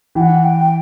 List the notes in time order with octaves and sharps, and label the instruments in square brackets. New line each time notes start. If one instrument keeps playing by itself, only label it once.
[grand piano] E3 [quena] G5
[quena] F#5
G5